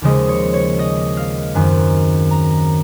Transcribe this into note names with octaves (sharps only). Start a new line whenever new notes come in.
D#2 C#3 F3 G#3 D#5
C#5
C#5
D#5
F5
F#2 D#3 F#3 C4 G#5
A#5